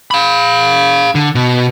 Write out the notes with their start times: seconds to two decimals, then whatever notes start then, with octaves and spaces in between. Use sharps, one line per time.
0.11 F5 B5
1.15 D3
1.35 B2